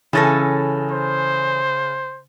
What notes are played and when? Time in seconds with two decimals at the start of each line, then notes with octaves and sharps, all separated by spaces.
0.13 C#3 E3 C#4 A4 A6 A#6
0.92 C5